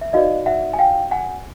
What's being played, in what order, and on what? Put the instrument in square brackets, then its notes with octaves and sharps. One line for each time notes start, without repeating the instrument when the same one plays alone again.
[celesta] E5
D#4 F#4 B4 D5 D#5 F5
E5 F#5
G#5
F5 G5
F#5 G#5